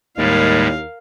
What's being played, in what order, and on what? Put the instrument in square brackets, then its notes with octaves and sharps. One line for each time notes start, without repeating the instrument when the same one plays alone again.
[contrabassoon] D#2 [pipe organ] A2 G3 G#3 [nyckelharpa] A#4 F5